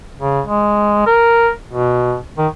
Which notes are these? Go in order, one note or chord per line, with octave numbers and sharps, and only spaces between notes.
C#3
G#3
A#4
B2
D#3